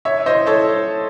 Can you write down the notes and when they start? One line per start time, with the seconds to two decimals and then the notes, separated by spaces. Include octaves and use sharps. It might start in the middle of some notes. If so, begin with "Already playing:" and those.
0.05 C#5 E5
0.26 C5 D#5
0.47 A4 C#5